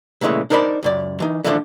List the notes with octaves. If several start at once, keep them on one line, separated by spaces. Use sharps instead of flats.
A#2 C#3 E3 G#3 A3
D4 D#4 A#4 C5 D5 B5
C#2 F#2 D5
E3 D#4
D3 E3 F3 A3 A#3 D4